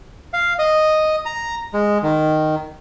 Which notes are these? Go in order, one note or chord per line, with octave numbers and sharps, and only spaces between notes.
F5
D#5
A#5
G#3
D#3